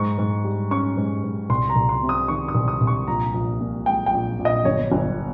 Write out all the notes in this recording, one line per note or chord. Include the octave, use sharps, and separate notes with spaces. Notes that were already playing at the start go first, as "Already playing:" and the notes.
Already playing: G#2 C#6
G#2
G3
C#4 C#6
G#2
G#2
C2 C6
A#5
C2
C6
C3
D#6
D#3 C#6
D#6
C2
D#6
C2
C#6
A#1 A#5
A#1
A#2
G#3 G5
G5
A#1
A#1
D#5
G1 C#5
G1